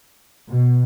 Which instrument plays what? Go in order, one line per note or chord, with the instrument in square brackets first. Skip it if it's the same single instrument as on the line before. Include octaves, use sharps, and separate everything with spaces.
[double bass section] B2